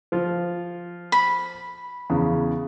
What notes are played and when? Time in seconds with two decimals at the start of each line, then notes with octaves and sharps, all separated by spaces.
0.12 F3 F4
1.12 B5
2.10 E2 C#3